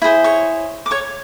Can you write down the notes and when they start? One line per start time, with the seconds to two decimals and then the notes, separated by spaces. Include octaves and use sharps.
0.02 E4 G#4 C5
0.24 C#5 C#6
0.86 D6
0.91 C#5 C#6